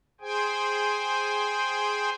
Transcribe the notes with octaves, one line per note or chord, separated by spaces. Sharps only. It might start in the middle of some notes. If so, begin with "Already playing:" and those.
G#4 C5 G5 G#5